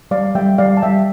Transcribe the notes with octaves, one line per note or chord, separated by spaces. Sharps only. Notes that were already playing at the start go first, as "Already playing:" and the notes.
G3 D5 F5
G3 E5 G5
G3 D5 F5
A5
G3 E5 G5